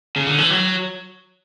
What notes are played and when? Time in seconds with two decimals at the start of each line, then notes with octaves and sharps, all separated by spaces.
0.16 C#3
0.27 D3
0.38 E3
0.50 F#3